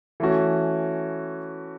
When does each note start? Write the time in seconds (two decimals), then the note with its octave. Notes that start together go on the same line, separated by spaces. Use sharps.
0.20 E3 A3 C#4 F#4